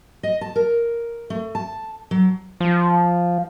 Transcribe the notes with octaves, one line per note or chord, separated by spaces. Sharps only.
D#5
A5
A#4
A3
A5
F#3
F3